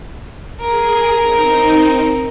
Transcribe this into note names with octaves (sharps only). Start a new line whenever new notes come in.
G#4 A#4
C4 D#4